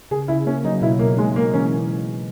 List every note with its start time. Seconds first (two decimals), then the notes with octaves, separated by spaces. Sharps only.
0.11 C#3 G#4
0.28 C#3 E4
0.46 A#3 C#4
0.64 F#3 D#4
0.82 B2 E4
0.99 B2 A#3
1.17 G#3 D#4
1.35 G#3 A#3
1.53 E3 C#4